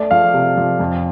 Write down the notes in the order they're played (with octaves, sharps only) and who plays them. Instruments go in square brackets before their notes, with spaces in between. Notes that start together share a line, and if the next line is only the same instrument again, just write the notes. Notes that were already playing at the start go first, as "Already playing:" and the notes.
Already playing: [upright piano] A3 D5
F3 F5
C3
F3
F2